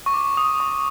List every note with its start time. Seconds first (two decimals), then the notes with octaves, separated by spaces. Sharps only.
0.06 C#6
0.14 D6
0.37 D#6
0.60 C#6